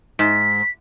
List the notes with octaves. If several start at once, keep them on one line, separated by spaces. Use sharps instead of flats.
G#2 B6